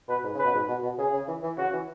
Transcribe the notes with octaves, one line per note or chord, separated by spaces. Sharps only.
B2 B4
G#2
C#3 B4
B2
G#2
B2
B2
C#3 G#4
C#3
E3
E3
C#3 F#4
E3